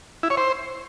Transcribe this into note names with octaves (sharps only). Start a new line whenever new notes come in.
E4
C#5
C5